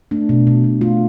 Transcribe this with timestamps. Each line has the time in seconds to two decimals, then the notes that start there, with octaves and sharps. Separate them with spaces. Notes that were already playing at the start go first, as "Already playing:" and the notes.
0.11 A3 D4
0.29 B2
0.47 B2
0.64 B2
0.81 A3 F4